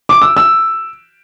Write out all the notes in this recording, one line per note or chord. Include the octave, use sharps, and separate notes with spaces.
D6
E6
E6